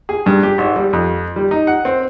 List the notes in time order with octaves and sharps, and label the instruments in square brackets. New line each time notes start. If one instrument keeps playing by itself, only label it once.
[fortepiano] G#4
G2
G4
G#1
G3
F2
G3
D#4
F#5
C4